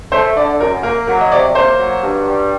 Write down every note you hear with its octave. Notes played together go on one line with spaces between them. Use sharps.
A3 C5
D3 D5
F#2 A#4
A#3 A#4
F#3 A#4
D#5
C3 D5
A#3 C5
F#3
G2
G3